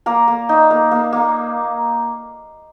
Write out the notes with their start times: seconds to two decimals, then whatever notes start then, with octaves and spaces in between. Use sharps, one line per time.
0.06 A#3 A#4
0.28 A#3
0.49 D#4
0.71 A#3
0.91 A#3
1.13 A#3